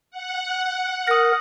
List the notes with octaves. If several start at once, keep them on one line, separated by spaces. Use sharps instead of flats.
F#5
A#4 D#6 A#6